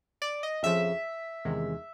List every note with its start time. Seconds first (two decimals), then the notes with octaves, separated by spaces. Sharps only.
0.22 D5
0.43 D#5
0.63 F2 C#3 F3 E5
1.45 E2 C3 D#3 G#3